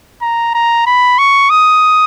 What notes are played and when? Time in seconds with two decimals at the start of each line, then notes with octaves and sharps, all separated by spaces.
0.22 A#5
0.54 A#5
0.86 B5
1.19 C#6
1.50 D#6